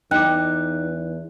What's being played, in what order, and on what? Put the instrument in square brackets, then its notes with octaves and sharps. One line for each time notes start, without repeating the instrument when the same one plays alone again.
[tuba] E2 [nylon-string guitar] D#4 [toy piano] G5 D6 [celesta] F#6